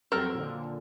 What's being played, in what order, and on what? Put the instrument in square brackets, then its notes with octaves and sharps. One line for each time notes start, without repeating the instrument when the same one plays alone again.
[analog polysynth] F2 F#3 C4 [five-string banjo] A4 A#4 G5
[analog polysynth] A#2 D3